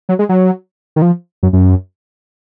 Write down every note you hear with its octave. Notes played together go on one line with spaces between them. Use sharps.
F#3
G#3
F#3
D#3
F3
F#2
F#2